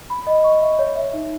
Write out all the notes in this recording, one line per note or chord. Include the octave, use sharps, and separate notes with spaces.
B5
D#5
C#6
E5
C#5
E5
D#4